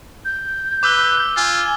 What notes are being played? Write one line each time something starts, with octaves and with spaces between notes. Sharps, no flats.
G6
B4 D6 E6 G7
F4 G#5